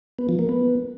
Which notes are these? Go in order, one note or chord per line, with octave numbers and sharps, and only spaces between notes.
B3
F3
A#3
B3